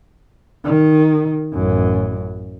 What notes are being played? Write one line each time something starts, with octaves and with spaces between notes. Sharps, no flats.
D#3
A1 F#2